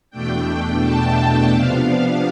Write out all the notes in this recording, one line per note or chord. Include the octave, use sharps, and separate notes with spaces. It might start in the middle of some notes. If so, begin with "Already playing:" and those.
E2 B2 A3 D4 G5
G5
A5
C3 F3 B3 D4 F5